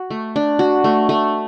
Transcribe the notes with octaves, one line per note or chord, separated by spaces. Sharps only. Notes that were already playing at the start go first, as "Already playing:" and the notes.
Already playing: F#4
A3
D4
F#4
A3
A3